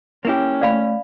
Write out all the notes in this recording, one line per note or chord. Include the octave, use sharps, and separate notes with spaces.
A#3 C#4 E4 G4
A3 D5 F5 B5